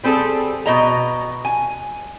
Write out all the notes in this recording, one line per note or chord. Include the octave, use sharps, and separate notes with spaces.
G3 C4 G#4 A4
B2 D#5 A#5
G#5